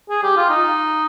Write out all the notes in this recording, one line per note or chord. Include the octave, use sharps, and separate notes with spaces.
G#4
G4
F4
D#4